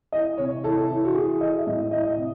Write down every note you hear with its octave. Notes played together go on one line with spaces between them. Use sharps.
E3 D#5
C3 C#5
E3 A4
E3
F#4
E3 G#4
E3 D#5
E5
A2 D#5
E5
E3 D#5
E5
D#5
C3